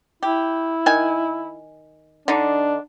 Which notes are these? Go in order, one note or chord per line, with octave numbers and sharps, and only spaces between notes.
E4 G4
D#3 G#5
D3 D4 D#4